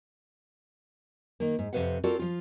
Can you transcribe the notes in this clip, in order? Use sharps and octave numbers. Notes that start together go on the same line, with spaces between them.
D#3 A#3
G#2
F2 C3 B3 B4 F5 F#5
C4 F4 F#4 A4 A#4 D5
F3 F4